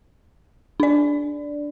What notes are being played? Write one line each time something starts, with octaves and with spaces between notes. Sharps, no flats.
D4 D5